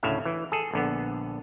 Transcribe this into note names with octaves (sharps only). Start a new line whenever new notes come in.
D2 A2 C#3 E5 F5
E3
G#4 A4
A#1 D3 B3